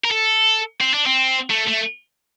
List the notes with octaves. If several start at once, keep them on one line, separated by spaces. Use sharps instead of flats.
A#4
A4
C4
D4
C4
A3
A3